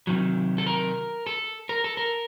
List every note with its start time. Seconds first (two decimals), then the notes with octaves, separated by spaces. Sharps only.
0.07 C3 D#3 F#3
0.58 A4
0.67 A#4
1.27 A4
1.69 A#4
1.84 A4
1.97 A#4